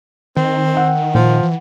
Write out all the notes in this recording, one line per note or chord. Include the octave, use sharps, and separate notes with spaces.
D#3 C4
F#5 G5 E6
A#2 F3
E3